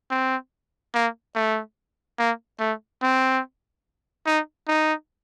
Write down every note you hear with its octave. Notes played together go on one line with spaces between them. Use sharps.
C4
A#3
A3
A#3
A3
C4
D#4
D#4